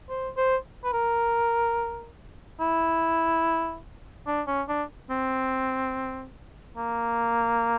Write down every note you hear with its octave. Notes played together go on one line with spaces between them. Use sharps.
C5
C5
B4
A#4
E4
D4
C#4
D4
C4
A#3